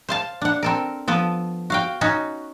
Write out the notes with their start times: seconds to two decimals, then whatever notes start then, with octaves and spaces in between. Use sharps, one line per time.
0.09 C5 F5 A5
0.42 D4 F#5
0.63 C4 A4 A#4
1.08 F3 B3 A4
1.70 F#4 F5 G5
2.01 C#4 D#4 F#4